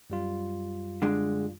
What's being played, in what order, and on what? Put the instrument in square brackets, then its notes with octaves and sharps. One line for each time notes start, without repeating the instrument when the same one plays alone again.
[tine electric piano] F#2 G3 F4
[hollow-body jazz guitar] D3 G#3 D4